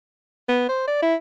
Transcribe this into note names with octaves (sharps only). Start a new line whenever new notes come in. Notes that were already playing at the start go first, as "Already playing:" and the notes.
B3
C5
D5
E4